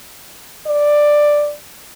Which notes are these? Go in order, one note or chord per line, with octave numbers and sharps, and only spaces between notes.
D5